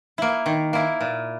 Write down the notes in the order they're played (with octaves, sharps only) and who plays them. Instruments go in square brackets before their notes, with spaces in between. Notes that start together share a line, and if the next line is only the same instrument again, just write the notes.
[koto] A#3 E4
D#3
A#3 E4
A#2